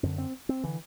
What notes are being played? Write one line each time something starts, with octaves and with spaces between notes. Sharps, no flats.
F#2 D3 C4
C4
C4
D3 E3